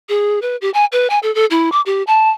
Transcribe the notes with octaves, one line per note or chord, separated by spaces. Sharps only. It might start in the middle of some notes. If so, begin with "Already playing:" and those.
G#4
B4
G4
G#5
B4
G#5
A4
A4
E4
D6
G4
A5